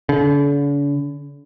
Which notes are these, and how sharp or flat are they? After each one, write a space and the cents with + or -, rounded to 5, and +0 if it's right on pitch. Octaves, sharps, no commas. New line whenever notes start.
D3 -45